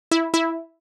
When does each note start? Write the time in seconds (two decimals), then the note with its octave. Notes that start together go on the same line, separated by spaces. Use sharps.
0.11 E4
0.34 E4